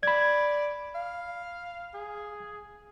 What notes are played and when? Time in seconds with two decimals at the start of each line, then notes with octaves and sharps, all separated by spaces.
0.03 D5 B5 G#6
0.95 F5
1.94 G#4